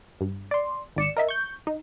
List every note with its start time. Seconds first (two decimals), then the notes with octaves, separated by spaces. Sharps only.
0.21 G2
0.51 D5 C6
0.96 G#1 D5 C#7 E7
1.17 A#4 D#5 E5
1.29 C#6 G6
1.67 D#4